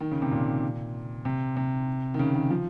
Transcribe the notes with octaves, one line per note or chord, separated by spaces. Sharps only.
D#3
C#3
C3
A#2
C3
C3
D#3
C#3
D#3
F3